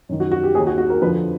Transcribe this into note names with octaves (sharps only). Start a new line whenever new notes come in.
F#2 D#3
F#4
F#4
G4
D#2 D#3 G#4
F#4
F#4
A#4
F2 D3 F3 B4